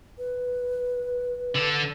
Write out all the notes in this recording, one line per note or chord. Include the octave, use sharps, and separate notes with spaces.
B4
D3 A4